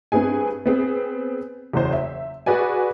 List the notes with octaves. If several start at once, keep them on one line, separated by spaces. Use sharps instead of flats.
G2 B3 C4 G#4 G#5
B3 C4 G#4
F#1 E2 C5
E5
F#4 G#4 B4 D5 G#5